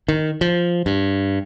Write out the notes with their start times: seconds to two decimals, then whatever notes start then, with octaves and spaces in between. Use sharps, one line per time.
0.08 D#3
0.41 F3
0.86 G2